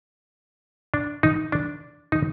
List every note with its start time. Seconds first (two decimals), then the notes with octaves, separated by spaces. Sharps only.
0.94 D4
1.23 D#4
1.52 D4
2.12 D#4